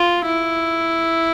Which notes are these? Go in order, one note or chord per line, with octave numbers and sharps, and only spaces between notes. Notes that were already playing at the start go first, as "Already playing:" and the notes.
Already playing: F4
E4